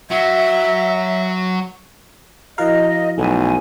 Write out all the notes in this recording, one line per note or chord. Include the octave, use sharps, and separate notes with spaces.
F#3 E5
F3 E4 F#4 A#4 D#5 F5
B1 F#3 A3 G#5